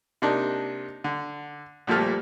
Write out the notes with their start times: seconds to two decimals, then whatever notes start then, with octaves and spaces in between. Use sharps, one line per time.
0.22 C3 A#3 D4 D#4
1.04 D3
1.87 D2 A#2 F3 G3 A3 F6